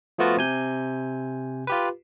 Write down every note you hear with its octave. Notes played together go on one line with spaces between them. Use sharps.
F3 A3 B3 F4 F#4
C3 G#5 G6
F4 G4 B4